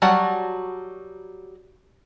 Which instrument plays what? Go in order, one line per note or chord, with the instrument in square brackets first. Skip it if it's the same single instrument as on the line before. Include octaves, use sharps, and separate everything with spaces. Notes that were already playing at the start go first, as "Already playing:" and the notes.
[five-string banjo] F#3 G3 F#4 F#5 A5